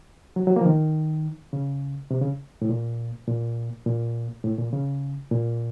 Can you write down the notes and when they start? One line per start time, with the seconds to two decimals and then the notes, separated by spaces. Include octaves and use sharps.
0.36 F#3
0.47 F#3
0.56 A#3
0.61 F3
0.66 D#3
1.53 C#3
2.11 C3
2.21 C#3
2.62 A2
2.69 A#2
3.28 A#2
3.86 A#2
4.44 A2
4.59 A#2
4.72 C#3
5.31 A#2